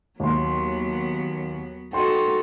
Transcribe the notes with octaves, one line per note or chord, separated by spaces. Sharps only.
D#2 F#3 B3 C6
D#4 F#4 A4 G5 C6